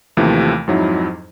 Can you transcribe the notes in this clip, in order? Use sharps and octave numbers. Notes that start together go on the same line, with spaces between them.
D#2 C3 E3 F3 A3
F2 G#2 F#3 D#4 E4